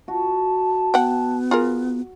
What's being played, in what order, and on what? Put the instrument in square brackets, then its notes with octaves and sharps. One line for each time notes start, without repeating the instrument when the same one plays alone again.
[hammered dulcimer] F#4 [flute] A5
[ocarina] B3 [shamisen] F#5 G5
[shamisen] F4 G#4 A#4